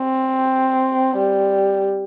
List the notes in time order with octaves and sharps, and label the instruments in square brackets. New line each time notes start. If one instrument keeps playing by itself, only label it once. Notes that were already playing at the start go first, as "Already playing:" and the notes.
Already playing: [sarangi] C4
G3